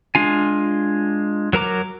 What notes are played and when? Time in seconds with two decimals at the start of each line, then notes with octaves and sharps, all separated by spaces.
0.15 G#3 D4 F4 G#5
1.53 F#3 A#4 A#5 D6